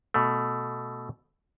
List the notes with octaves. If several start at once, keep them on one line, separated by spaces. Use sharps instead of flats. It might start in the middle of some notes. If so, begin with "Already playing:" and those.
B2 A3